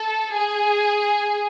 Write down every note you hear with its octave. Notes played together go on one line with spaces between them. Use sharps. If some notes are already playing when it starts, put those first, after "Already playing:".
Already playing: A4
G#4